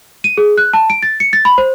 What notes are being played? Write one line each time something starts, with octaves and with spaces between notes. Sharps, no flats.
D#7
G#4
F#6
A5
D7
A6
C#7
A6
B5
C5